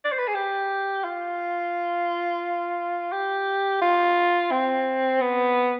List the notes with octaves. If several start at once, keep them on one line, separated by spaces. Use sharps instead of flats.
D5
C5
B4
G#4
G4
F4
G4
F4
C4
B3